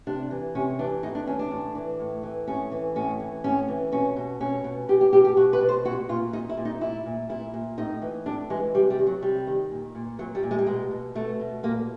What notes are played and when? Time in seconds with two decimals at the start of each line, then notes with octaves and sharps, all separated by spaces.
0.07 C3 D4
0.31 E3
0.55 C3 C#4
0.79 E3 D4
1.03 A2 D#4
1.15 D4
1.27 E3 C#4
1.39 D4
1.51 A2
1.75 E3
1.99 A2
2.23 E3
2.47 A2 C#4
2.71 E3
2.95 A2 C#4
3.20 E3
3.44 A2 C#4
3.68 E3
3.92 B2 C#4
4.16 B2
4.40 B2 C#4
4.64 B2
4.88 B2 G4
5.01 G4
5.13 B2 G4
5.25 G4
5.37 B2 F#4
5.53 B4
5.61 B2
5.69 C5
5.85 A#2 F#4
6.09 A#2 F4
6.33 A#2 D#4
6.49 E4
6.57 A#2
6.65 D#4
6.81 A#2 E4
7.06 A#2
7.29 A#2 E4
7.54 A#2
7.77 A2 D#4
8.02 E3
8.26 A2 D4
8.50 E3 G#3
8.74 C3 G3
8.90 G3
8.99 D#3
9.07 F#3
9.22 C3 G3
9.47 D#3
9.71 A#2
9.95 A#2
10.19 A#2 F#3
10.35 G3
10.43 A#2
10.51 G#3
10.59 G3
10.67 B2 G#3
10.91 B2
11.15 B2 A3
11.40 B2
11.63 A#2 A#3